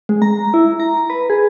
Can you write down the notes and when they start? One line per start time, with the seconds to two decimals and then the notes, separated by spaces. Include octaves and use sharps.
0.09 G#3
0.22 A#5
0.54 E4
0.80 A#5
1.10 B4
1.30 G#4